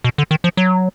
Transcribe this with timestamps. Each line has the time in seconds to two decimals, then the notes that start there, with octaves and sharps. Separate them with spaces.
0.04 B2
0.18 D3
0.31 D#3
0.44 F3
0.57 F#3